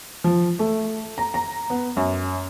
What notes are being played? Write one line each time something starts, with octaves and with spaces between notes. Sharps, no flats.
F3
A3
A#5
A#5
B3
F#2